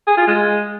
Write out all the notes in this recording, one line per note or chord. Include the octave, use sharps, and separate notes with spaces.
G#4
F4
G#3